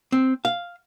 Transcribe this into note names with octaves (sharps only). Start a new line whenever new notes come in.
C4
F5